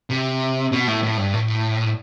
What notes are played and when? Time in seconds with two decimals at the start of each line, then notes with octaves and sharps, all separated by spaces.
0.10 C3
0.72 B2
0.87 A2
1.03 A2
1.17 G2
1.33 A2